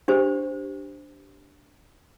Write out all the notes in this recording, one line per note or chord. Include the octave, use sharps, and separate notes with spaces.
D4 G4 C5